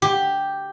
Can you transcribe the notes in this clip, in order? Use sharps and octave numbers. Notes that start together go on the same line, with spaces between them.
G4